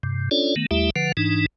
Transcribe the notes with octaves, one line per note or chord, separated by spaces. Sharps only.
G2 C3
C#4 D4 F4 A4 C#5 D5
D#3 A3 B3
D#2 G3 A3 E4 G4 E5
D3 F3 B4 F#5
G#2 E3 D4 D#4